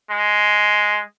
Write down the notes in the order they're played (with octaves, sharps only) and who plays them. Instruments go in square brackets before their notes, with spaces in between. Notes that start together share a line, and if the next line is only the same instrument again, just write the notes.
[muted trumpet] G#3